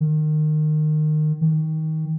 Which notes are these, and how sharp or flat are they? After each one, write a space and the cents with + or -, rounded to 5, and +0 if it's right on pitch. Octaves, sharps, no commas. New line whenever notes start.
D#3 -25
D#3 +20